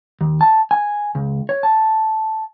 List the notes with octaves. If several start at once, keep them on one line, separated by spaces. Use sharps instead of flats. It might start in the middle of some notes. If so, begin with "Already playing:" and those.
D#2
A5
G#5
C#2
C#5
A5